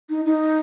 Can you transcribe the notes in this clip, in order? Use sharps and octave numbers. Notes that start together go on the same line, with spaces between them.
D#4
D#4